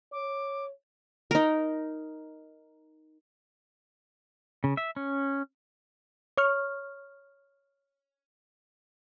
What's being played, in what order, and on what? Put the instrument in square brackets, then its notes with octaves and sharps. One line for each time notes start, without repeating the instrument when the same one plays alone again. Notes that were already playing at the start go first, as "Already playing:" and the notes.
[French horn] C#5 [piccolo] D6
[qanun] D#4 A#4
[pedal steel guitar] C#3
E5
C#4
[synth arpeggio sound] C#5 C#6 F6